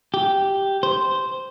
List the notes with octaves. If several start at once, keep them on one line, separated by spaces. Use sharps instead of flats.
G4
C5